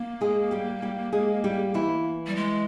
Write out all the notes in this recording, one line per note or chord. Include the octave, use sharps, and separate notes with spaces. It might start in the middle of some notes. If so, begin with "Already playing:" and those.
Already playing: A#3
G#3 G#4
G3 G4
G3 G4
G#3 G#4
G3 G4
E3 E4
G3
G#3